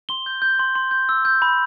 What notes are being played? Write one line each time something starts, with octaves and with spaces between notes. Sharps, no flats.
C6 G7
G6
G6
C6
C6
G6
E6
G6
B5